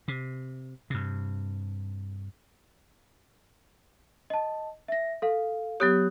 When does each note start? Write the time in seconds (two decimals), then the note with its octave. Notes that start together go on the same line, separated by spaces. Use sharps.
0.08 C3
0.90 G2 C3
4.30 D#5 A5
4.88 E5 A#6
5.22 A4 F5
5.80 F#3 B3 G4 C#5 D#6 F#6